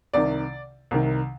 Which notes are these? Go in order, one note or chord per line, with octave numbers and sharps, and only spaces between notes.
C2 C3 D#3 D5
C2 C3 D#3